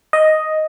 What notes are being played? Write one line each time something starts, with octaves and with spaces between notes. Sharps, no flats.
D#5